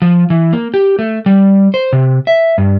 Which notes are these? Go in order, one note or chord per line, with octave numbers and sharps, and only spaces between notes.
F3
E3
A#3
G4
A3
G3
C5
C3
E5
G2